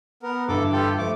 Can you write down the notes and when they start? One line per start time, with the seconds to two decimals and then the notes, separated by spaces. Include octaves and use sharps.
0.23 B3 A#4
0.48 G2 D3 E3 A4 D6
0.72 F4 G4 A4
0.98 F3 A3 D6